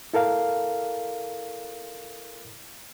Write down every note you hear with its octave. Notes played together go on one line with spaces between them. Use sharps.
E4 A4 A#4 F5